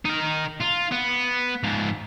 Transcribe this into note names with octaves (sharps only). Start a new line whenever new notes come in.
D#4 A#4
F4
B3
G#2 F3